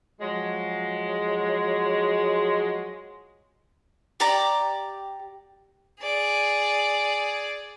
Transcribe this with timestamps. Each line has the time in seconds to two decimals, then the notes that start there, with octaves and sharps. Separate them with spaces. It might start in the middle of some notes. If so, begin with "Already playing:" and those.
0.21 F3 F#3 G#3
4.20 G4 D5 A#5
6.02 G#4 D5